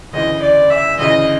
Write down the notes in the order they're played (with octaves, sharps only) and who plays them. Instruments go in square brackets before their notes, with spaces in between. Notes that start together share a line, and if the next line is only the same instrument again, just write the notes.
[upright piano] D2 C#3 E3 [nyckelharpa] D#5
[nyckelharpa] D5
E5
[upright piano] D2 C#3 E3 [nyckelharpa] D#5